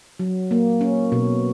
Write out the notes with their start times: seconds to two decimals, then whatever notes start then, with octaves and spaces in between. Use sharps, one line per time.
0.19 F#3
0.51 A#3
0.81 C#4
1.12 B2